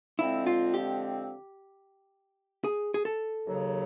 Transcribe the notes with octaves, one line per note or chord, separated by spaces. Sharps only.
D3 F3 G#3 C4 E4
F4
G4
G#4
G#4
A4
D#2 C#3 F#3